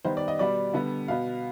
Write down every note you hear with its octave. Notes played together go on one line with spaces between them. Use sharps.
D#3 G3 B3 C5
D5
D#5
B2 G3 B3 D5
D3 G3 B3
B2 B3 F5